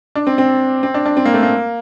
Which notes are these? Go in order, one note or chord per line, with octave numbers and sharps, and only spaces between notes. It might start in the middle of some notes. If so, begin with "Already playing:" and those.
D4
C4
C4
C4
D4
D4
C4
A#3
A3
A#3